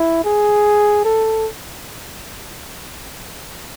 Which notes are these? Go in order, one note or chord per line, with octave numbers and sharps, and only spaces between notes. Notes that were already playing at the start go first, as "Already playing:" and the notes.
Already playing: E4
G#4
A4